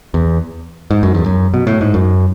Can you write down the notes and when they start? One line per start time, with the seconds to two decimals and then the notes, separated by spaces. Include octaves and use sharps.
0.14 E2
0.91 G#2
1.03 F#2
1.14 E2
1.26 F#2
1.54 B2
1.67 A2
1.81 G#2
1.94 F#2